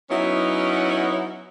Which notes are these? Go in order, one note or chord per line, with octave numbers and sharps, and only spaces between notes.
F#3 B3 C#4 D#4 E4